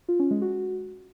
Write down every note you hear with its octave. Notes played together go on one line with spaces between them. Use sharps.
F4
C#4
G#3
F#4